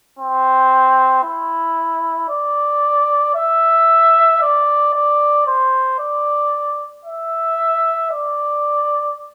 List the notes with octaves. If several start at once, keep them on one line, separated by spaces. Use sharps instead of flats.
C4
E4
D5
E5
D5
D5
C5
D5
E5
D5